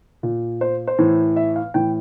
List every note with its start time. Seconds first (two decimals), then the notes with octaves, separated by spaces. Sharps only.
0.23 A#2
0.61 C5
0.87 C5
0.99 A2 E3
1.36 E5
1.56 F5
1.74 A2 E3 G5